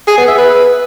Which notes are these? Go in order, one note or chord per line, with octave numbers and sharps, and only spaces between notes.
G#4
B3
E5
B4